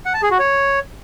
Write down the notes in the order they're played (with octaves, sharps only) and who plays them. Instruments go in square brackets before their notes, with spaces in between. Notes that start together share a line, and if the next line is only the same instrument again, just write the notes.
[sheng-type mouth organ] F#5
A5
G#4
F#4
C#5